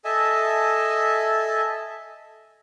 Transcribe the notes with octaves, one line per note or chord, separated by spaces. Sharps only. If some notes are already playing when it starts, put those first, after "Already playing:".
A4 D#5 E5 G#5 A5